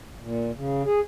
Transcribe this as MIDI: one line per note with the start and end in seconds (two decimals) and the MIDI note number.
0.20 0.51 46
0.54 0.83 49
0.84 1.00 68